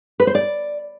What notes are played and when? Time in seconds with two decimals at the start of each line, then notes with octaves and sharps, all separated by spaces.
0.20 B4
0.27 C5
0.35 D5